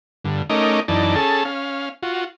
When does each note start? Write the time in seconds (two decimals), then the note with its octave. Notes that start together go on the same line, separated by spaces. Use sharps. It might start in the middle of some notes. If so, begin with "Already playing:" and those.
0.25 G2 D3
0.50 A3 C#4 D#4 A#4 D#5 D6
0.88 F#2 E3 D#4 D5 A5
1.16 C#4 G#4 A4 A5
1.45 C#4 F5
2.03 F4 F#4